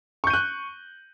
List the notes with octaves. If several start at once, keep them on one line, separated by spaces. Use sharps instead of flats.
C#6 F#6 G6 D#7